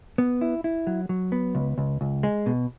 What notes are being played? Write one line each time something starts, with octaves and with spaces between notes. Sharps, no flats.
B3
E4
E4
F#3
F#3
B3
C#2
C#2
C#2
G#3
B2